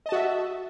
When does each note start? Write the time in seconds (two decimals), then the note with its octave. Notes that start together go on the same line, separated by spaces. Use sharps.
0.06 D#5
0.09 A5
0.12 F#4
0.15 E5